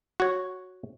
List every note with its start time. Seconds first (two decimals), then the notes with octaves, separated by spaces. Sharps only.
0.20 F#4 C#5